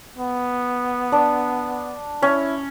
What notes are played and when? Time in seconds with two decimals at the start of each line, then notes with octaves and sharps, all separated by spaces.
0.17 B3
1.12 D4
2.22 C#4 E4